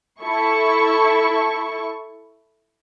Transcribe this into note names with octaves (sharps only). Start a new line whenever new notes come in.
E4 A4 C#6